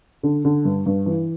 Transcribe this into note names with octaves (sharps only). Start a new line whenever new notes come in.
D3
D3
G2
G2
E3